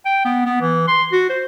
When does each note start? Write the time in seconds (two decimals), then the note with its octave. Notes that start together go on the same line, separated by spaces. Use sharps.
0.05 G5
0.25 B3
0.45 B3
0.61 E3
0.88 C6
1.12 F#4
1.30 C5